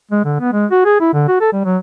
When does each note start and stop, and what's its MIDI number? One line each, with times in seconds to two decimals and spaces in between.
0.11 0.22 56
0.25 0.39 50
0.40 0.52 59
0.53 0.66 56
0.71 0.80 66
0.85 0.96 68
1.00 1.11 64
1.13 1.26 50
1.28 1.39 66
1.41 1.52 69
1.53 1.61 55
1.65 1.77 54